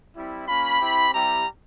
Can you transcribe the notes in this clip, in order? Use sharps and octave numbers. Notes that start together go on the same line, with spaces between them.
G3 C4 E4
A#3 C#4 F4 B5
C4 E4 G4
G3 C4 E4 G4 A#5